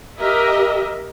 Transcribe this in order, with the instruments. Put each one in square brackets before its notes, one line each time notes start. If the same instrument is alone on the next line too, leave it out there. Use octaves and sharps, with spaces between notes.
[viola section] G4 A#4 D#5 E5